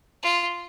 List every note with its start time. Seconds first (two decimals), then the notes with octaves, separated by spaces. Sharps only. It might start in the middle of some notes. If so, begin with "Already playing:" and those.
0.23 F4